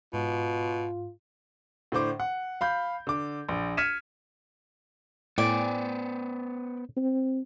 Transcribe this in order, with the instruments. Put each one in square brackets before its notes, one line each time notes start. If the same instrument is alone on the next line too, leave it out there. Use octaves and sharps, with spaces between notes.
[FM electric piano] G#2 [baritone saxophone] B2 [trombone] F4
[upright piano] A2 D3 C5 D6
F#5
F5 B5 G6
D3 D6
A#1
F6 G#6 B6 C#7 D#7 E7
[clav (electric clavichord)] A2 [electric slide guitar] B3 C5 [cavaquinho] D5 G5 G#5
[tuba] C4